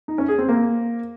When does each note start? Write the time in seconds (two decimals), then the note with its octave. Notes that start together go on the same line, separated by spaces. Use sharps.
0.08 D#4
0.18 C#4
0.28 G#4
0.38 C4
0.49 A#3